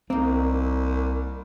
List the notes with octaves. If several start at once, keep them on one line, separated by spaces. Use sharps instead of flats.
C2 A#3 C4 D#4